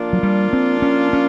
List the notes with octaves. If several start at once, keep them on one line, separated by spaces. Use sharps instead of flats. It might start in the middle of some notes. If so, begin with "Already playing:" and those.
Already playing: F3 A#3 D4 F4
F#3
G3
C4
C#4
C#4